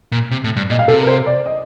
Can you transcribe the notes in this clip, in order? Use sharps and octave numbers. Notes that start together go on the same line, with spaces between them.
A#2
C3
A2
G2
A#2 D#5
F5
C3 A4
A#4
C5
D5
D#5